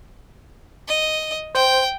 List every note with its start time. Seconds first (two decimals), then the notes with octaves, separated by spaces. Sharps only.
0.88 D#5
1.55 C5 G5